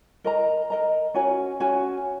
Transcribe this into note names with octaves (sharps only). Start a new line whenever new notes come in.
A#4 D#5 A#5
A#4 D#5 A#5
C#4 F#4 C#5 G#5
C#4 F#4 C#5 G#5